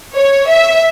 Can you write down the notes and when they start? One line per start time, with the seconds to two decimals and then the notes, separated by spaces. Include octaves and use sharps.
0.15 C#5
0.48 E5